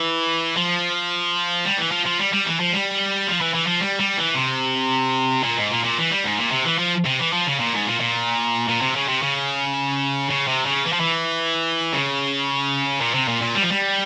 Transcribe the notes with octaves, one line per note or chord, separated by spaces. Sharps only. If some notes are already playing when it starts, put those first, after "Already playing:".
Already playing: E3
F3
G3
E3
F3
F3
G3
G3
E3
F3
G3
F3
E3
E3
F3
G3
G3
E3
C3
A#2
G#2
A#2
A#2
E3
G3
G#2
A#2
C3
E3
F3
C3
E3
F3
C#3
A#2
G#2
A#2
A#2
A#2
C3
C#3
C3
C#3
C#3
C3
C#3
E3
F3
E3
C#3
A#2
C3
A#2
A#2
G3
F3
G3